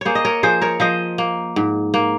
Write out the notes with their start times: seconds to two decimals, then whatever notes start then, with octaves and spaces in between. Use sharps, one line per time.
0.01 A#3 G#4 C5 C#5
0.15 D#5
0.25 A#4 C#5
0.43 F3 G#4 C5
0.62 A#4 C#5
0.80 F3 C5 D#5
1.18 A#3
1.56 G#2
1.94 A#3